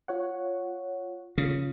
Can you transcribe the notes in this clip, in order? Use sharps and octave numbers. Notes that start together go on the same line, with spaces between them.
F4 C#5 F#5
C#3 F4